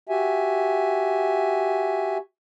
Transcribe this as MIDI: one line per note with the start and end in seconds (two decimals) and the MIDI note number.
0.09 2.17 66
0.09 2.17 67
0.09 2.17 76
0.09 2.17 80